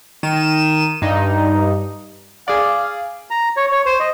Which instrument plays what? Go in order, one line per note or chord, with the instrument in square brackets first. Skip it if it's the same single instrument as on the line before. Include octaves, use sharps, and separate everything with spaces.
[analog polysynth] D#3 D#7 E7
G2 D#4
[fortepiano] G#4 D5 [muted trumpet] F5
[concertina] A#5
C#5
C#5
C5
D#5